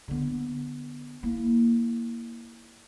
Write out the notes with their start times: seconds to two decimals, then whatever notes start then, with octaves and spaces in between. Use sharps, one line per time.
0.08 D3 B3
1.23 A#3 E4